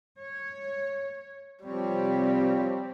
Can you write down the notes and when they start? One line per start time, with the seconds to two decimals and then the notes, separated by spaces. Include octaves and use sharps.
0.19 C#5
1.65 C3 F3 G3 C4 G4 C#5